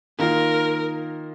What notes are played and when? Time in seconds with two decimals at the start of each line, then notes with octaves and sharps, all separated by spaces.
0.19 D#3 A#3 F4 A#4